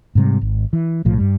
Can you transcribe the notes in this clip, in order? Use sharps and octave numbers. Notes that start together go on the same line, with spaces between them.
G#2 C3 G3
G#1
E3
B1 A2 F3
G2 G3